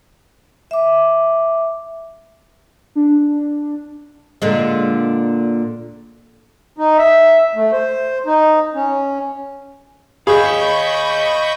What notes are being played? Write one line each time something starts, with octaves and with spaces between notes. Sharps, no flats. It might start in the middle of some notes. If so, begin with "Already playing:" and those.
E5 D6
D4
A#2 D3 G#3
D#4
E5
A3
C5
D#4
C#4
G#4 D#5 F5 B5 C#6 G6